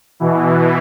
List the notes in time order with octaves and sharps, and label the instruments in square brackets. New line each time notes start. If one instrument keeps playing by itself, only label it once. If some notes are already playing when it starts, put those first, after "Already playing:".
[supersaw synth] B2 E3